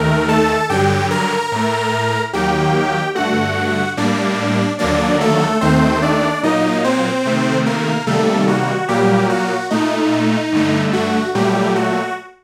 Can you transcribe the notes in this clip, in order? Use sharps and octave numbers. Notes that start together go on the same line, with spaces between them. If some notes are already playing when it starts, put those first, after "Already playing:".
Already playing: D#2 D#3 A3 A#4
A4 A5
G2 D3 F#3 G4 G5
A#4 A#5
A2 A3
D#2 D#3 F#3 A#3 G4 G5
G2 D3 A3 F#4 F#5
A2 G3 A#3 D4 D5
D#2 D3 F#3 A#3 D4 D5
A3 A4
D#2 D#3 A3 C4 C5
D4 D5
A#2 F#3 A#3 D#4 D#5
C4 C5
C3 D#3 A3
A#3 A#4
C3 D#3 G3 A3 A#3 A4
F#4
A#2 F#3 G3 A#3 G4
F#4
A#2 A3 D#4
G2 D3 A3
F#4
A#2 F#3 G3 A3 G4
F#4